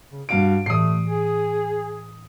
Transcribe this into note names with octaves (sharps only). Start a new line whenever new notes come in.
C#3
G2 F#4 F5 D7
A2 E3 A3 D#6 C7
G#4